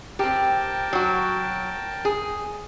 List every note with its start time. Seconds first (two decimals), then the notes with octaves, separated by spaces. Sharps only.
0.19 C4 G4 A#4 G5 A5
0.93 F#3 F#4
2.05 G#4